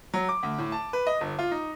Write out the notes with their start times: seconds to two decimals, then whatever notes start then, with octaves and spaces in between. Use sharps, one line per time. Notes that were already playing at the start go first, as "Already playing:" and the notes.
0.13 F#3
0.29 D6
0.43 D2
0.58 A2
0.72 A5
0.93 B4
1.07 D#5
1.21 G1
1.39 F4
1.51 D#4